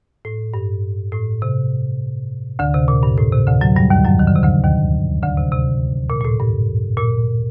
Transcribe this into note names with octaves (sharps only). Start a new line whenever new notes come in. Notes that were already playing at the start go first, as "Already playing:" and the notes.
A2
G2
A2
C3
D2 D3
C3
A#2
G2
A2
C3
D2 D3
F#2 F#3
G2 G3
D#2 D#3
F#2 F#3
D#3
D3
C3
D2 D3
D#2 D#3
D2 D3
C3
C3
A#2
A#2
A2
G2
A#2